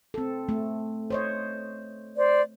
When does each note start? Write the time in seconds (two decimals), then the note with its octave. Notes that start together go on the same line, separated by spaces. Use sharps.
0.14 C4 A4
0.49 A3
1.10 C5 C#5 D#5
2.17 C5 D5